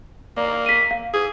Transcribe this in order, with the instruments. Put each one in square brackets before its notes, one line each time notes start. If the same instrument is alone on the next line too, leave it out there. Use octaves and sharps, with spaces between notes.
[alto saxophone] A#3 [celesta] D5
[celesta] B6 D#7
F5
[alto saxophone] G#4